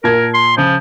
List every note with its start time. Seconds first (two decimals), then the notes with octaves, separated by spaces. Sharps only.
0.04 A#2 A#4 A5 G#6
0.34 C6
0.58 C#3 F3